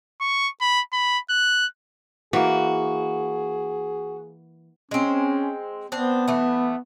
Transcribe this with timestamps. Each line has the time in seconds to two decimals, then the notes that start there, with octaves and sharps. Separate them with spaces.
0.21 C#6
0.61 B5
0.92 B5
1.30 F#6
2.33 E3 A#3 F#4 G#4
4.91 G#3 C4 C#4
5.92 B3 C4 D4 C5
6.28 E3 A3